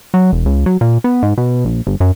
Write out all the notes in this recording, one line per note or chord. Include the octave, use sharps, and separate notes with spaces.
F#3
E1
C#2
F#3
A#2
B3
G#2
B2
A#1
G1
F#2